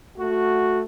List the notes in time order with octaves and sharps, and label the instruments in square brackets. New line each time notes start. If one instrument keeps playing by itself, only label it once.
[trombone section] A3 F#4